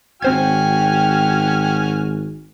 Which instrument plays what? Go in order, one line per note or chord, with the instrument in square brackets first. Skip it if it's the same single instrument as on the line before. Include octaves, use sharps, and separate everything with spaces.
[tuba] G#1 [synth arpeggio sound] C4 C5 G#6 [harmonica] F#4 G#5 F6 [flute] G5